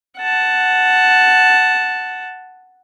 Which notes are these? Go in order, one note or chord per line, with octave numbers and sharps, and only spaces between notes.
F#5 A5